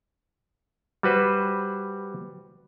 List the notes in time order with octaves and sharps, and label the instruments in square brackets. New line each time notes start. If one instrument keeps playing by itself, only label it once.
[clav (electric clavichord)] G3 F#4 B4 C5